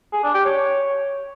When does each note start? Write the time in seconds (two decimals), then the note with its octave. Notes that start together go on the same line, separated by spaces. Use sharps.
0.13 G#4
0.24 D4
0.35 G4
0.45 C#5